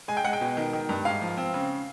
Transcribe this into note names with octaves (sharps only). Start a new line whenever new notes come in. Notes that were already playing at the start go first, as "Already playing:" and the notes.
G#3 G#5
G5
G#3 F#5
G5
B2
D#3
D#3
G2
G#2 F5
F3
C4
C#3